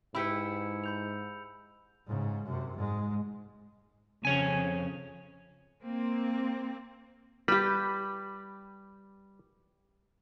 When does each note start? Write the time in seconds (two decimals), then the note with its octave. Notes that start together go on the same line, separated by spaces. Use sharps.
0.15 G#2 E4 G4 B4 B5 E6 C#7
0.84 B5 G6 F7
2.07 G#2 C#3
2.45 F#2 C3
2.77 G#2 G#3
4.25 F2 C#3 C#5 G#5
5.83 A#3 C4
7.48 G3 G4 B4